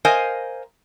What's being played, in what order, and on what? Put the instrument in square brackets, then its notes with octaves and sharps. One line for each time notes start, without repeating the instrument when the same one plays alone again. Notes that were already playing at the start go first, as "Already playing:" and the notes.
[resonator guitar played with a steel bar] A#4 C5 D#5 F5 G#5